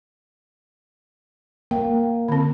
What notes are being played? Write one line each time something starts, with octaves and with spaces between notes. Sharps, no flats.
A#3 G5
D3 C4